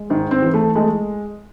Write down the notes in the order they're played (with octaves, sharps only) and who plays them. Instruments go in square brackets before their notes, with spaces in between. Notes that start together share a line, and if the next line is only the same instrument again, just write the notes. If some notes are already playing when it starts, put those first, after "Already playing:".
Already playing: [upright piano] G#3
[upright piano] G#2 [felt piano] D#3
[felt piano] C4
[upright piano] E3
[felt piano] A3
[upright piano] G#3 [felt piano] A3